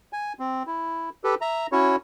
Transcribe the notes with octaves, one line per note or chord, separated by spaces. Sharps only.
G#5
C4
E4
G4 A4 B4
E5 A#5
C#4 E4 F#4 C#5